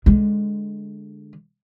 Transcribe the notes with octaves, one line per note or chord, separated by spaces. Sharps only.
D3 G#3